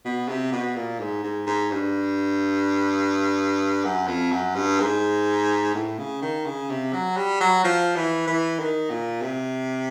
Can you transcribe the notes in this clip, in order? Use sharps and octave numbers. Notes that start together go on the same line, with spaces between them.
B2
C3
B2
A#2
G#2
G#2
G#2
G2
F#2
F2
F#2
G2
G#2
A2
C#3
D#3
C#3
C3
F#3
G3
F#3
F3
E3
E3
D#3
A#2
C3